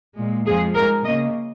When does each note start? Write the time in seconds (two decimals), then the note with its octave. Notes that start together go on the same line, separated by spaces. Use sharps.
0.17 A#2 G#3
0.46 F2 F3 G#3 G#4
0.75 G#2 G#3 A#4
1.04 C#3 A#3 D#5